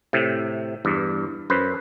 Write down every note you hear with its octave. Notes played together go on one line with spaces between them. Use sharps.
A2 C3
E2 G2
F#2 B4 C5